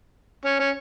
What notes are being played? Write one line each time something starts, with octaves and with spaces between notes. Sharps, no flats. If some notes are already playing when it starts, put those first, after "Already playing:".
C#4
C#4